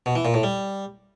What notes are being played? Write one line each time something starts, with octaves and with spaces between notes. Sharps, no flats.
B2
E3
A#2
A2
G3